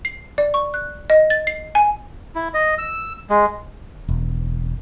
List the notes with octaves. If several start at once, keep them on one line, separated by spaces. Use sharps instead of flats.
C7
D5
C#6
F#6
D#5
A6
C7
G#5
E4
D#5
E6
G#3
E1